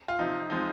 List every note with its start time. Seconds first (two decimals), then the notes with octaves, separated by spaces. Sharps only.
0.08 F4
0.19 C3 F3 C4 D#4
0.50 F3 G#3 C4 D#4